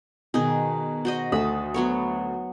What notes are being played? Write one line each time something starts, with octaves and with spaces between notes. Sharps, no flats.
B2 D#3 D#4 G#4
F#4 C5 D#5
D2 A3 A5 B5 D#6
F#3 B3 C#5